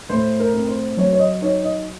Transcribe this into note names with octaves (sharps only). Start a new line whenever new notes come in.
A2 C5
A#4
C4
C5
F#3 C#5
C#5
D#5
D#4 C#5
D#5